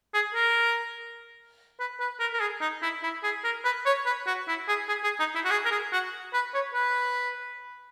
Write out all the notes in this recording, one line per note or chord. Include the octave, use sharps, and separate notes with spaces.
G#4
A#4
B4
B4
A#4
A#4
G#4
D#4
E4
E4
G#4
A#4
B4
C#5
B4
F#4
E4
G#4
G#4
G#4
D#4
E4
F#4
G#4
A#4
G#4
F#4
B4
C#5
B4